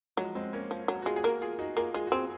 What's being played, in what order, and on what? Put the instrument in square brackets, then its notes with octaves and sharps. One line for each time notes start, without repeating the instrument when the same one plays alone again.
[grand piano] F3 G#3 [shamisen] F#3
[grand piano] G#3 C4
A#3 C#4
[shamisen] F3
F#3
[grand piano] F#4
[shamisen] G#3 [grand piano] F4 G#4
[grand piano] G#4
[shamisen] A#3 [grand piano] F#4 A#4
[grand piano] F4 G#4
D#4 F#4
[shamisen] A#3 [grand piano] F4 G#4
[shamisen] G#3 [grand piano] F4 G#4
[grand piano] F#4
[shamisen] C4 [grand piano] F4 G#4